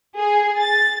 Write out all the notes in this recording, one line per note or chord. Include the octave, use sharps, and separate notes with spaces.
G#4
A6